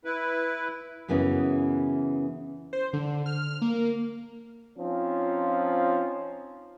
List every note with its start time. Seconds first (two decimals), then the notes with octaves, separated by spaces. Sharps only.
0.05 E4 B4
1.08 F#2 C#3 E3 B3 C#4 E4
2.73 C5
2.93 D3
3.26 F6
3.62 A#3
4.78 F3 C4 C#4 D#4 F4